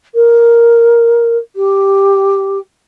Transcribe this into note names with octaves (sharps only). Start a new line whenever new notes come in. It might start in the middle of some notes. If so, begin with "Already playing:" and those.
A#4
G4